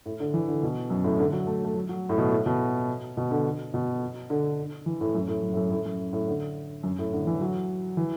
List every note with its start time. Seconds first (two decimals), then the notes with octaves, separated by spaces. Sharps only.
0.06 A2
0.20 D3
0.34 E3
0.48 D3
0.63 B2
0.90 F#2
1.04 A2
1.19 D3
1.32 F#3
1.47 A3
1.65 A3
1.75 F#3
1.89 F#3
2.09 A2
2.18 B2
2.31 A2
2.46 B2
3.17 B2
3.31 D3
3.74 B2
4.30 D3
4.86 E3
5.01 A2
5.15 F#2
5.28 A2
5.42 F#2
5.53 A2
5.57 F#2
5.71 A2
5.86 F#2
6.13 A2
6.28 D3
6.83 F#2
6.99 A2
7.13 D3
7.27 E3
7.41 F#3
7.97 E3